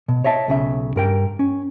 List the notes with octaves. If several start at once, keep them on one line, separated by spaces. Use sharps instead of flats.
B2
C#5 D#5 E5 A5
B1 C#3 E5
G2 A#4 G5
C#4